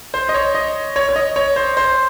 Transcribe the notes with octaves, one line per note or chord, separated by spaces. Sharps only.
C5
D#5
C#5
D#5
C#5
C#5
D#5
C#5
C5
C5